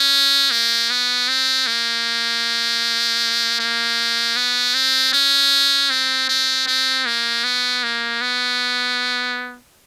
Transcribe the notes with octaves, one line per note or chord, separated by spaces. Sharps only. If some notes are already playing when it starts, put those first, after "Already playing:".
Already playing: C#4
A#3
B3
C4
A#3
A#3
B3
C4
C#4
C4
C4
C4
A#3
B3
A#3
B3